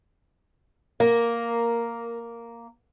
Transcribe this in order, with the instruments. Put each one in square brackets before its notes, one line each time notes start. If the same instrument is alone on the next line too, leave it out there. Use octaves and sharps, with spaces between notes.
[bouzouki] A#3 [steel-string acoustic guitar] A#4